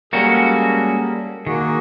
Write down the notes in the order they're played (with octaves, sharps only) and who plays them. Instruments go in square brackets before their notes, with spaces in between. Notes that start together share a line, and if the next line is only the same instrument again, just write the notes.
[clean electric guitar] G3 A#3 [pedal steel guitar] G#3 C#4 F#4 [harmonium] G#4 A4
[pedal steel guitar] D#3 [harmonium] A#3 F#4 G#4